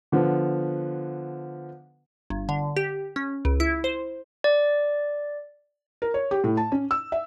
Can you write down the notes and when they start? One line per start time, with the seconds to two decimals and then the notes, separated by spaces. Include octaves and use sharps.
0.12 D3 F3 B3
2.30 G1
2.49 D3
2.77 G4
3.16 C#4
3.45 C#2
3.60 E4
3.84 C5
4.44 D5
6.02 A#4
6.14 C#5
6.31 G4
6.44 A2
6.57 A5
6.72 C#4
6.91 E6
7.12 E5